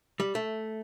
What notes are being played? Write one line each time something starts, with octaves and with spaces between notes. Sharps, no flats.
G3
A3